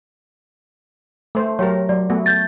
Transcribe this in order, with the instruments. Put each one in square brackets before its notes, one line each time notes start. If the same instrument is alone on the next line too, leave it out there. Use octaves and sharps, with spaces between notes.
[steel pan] A3 C5
[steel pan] F#3 G4 A#4 [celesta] C#5
[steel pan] F#3 [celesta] D5
[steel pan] A3 B3 F#4
[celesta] G6 A6